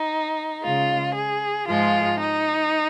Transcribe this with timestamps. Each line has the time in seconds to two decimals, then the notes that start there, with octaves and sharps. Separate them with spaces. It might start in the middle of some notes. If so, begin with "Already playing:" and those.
Already playing: D#4
0.62 C#3 G#3 F4
1.15 G#4
1.68 G#2 F3 G#3 F4
2.21 D#4